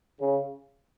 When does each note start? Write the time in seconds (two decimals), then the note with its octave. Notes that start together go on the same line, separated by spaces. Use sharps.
0.20 C#3